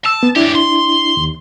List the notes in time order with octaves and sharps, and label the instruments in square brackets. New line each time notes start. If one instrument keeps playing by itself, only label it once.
[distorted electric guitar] A5 [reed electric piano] E6
[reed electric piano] B3
[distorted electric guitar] F#2 G4 [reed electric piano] D4 E4
[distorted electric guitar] C6
[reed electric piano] D#2